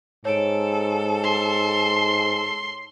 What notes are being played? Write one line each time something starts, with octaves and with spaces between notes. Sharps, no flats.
G#2 A4 C#5 D7
C6